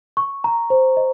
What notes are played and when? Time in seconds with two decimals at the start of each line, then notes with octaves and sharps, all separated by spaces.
0.17 C#6
0.44 A#5
0.70 C5
0.97 D#5